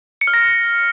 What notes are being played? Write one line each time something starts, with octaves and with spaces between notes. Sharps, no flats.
C#7
F6
A#6